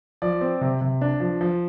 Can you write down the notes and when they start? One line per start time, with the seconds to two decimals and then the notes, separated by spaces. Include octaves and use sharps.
0.22 F3 D5
0.41 C4
0.61 C3
0.81 C3
1.01 D4
1.20 F3
1.41 F3